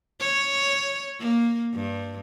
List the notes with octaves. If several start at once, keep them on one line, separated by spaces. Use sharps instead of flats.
C#5
A#3
G2